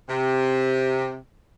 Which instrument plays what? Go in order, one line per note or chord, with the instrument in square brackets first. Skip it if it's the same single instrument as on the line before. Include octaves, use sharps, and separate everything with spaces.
[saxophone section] C3